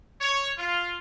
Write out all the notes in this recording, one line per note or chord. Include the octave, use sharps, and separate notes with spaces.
C#5
F4